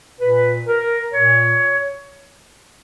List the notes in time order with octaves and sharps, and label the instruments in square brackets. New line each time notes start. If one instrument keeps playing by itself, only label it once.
[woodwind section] A#2 B4
A#4
A#2 C#5